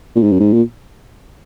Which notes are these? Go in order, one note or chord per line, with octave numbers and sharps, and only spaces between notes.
A#2
G#2
F#2
G#2
A#2